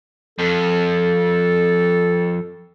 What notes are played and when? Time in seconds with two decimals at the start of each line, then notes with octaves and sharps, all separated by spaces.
0.39 F2 A4